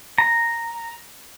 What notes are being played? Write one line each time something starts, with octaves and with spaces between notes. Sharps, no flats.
A#5